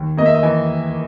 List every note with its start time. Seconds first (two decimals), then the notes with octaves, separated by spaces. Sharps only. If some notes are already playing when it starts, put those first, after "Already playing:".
Already playing: D#2
0.17 A#3 D#5
0.26 E5
0.35 D#5
0.43 E3 G#5